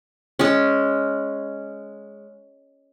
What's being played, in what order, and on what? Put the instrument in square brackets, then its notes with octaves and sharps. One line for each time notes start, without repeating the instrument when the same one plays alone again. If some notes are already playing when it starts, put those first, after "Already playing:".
[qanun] G#3 C#4